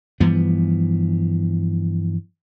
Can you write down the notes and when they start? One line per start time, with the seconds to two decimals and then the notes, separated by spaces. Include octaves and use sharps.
0.20 G2 E3 F3 B3